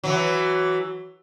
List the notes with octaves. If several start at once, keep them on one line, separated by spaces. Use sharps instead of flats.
E3 F#3